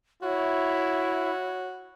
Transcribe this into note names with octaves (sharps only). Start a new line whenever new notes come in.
E4 F#4 C#5